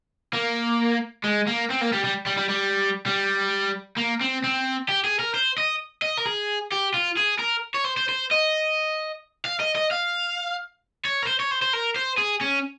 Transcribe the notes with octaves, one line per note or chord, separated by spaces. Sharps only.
A#3
G#3
A#3
C4
A#3
G3
G3
G3
G3
G3
G3
A#3
C4
C4
G4
G#4
A#4
C5
D#5
D#5
A#4
G#4
G4
F4
G#4
A#4
C#5
C5
C5
C5
D#5
F5
D#5
D#5
F5
C#5
A#4
C5
C#5
C5
C5
A#4
C5
G#4
C#4